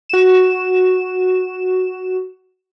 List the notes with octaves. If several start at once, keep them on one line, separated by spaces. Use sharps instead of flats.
F#4 E7